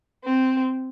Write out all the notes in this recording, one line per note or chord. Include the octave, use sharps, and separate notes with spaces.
C4